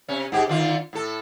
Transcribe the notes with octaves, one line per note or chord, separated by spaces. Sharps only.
C3 C#4
G#2 G4 G#4
D3 D#3 F4
A2 A4